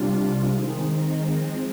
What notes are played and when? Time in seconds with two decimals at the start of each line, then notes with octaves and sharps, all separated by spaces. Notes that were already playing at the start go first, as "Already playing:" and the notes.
Already playing: C3 G3 D4 F4
0.48 D#3 G#3 C4 D#4
1.29 F3 G#3 C4